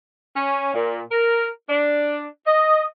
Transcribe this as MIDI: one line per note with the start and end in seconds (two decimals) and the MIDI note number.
0.36 0.74 61
0.74 1.02 46
1.11 1.48 70
1.70 2.25 62
2.47 2.83 75